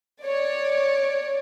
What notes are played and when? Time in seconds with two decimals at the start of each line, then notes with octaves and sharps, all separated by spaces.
0.24 C#5 D5